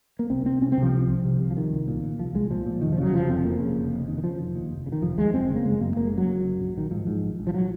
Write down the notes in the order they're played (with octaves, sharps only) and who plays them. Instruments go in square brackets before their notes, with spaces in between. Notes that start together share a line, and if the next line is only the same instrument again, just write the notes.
[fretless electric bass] A#3
C2 C4
C2 C4
C3 C#4
C4
C3 F3
C2
C2
C3
C3
F3
C2 D#3
C2
A#2
A#2
C2 F3
C2 G#3
A#2 F3
A#2
F1 D#3
F3
C#3
F#3
F1 F3
F2 C4
F1 A#3
C#3
F1
F2
F1 D#3
D#3
C#3 F3
F1
D#2
F1
C#3
D#3
F1 F3
D#2 G#3
F#1 C4
C#3
A#3
F#1 G#3
F#2 A#3
F#1 A#3
G#3
C#3 F#3
F#1
F#2
A#1
A#1 D#3
G#2 F3
G#2
A#1
A#1
F3
F#3